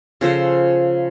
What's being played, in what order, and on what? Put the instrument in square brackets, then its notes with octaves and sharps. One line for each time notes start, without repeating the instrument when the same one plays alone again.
[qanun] C#3 F3 A4 C5